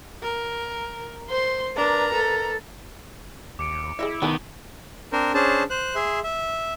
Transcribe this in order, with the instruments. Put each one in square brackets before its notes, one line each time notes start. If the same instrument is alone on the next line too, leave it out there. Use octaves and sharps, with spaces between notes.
[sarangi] A#4
[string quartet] C5 [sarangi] C6
[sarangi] D4 [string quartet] A#4 B4 A#5
[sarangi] A4
[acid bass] D#2 [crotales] D6 C#7 D7
[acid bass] E4 [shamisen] G#4 D#5 E5
[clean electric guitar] D#3 B3 [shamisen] A4 G5 A5
[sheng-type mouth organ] C4 D4 A#4 C5
C#4 D4 G#4 C5 A5
C5 F#6
G#4 E5 C6
E5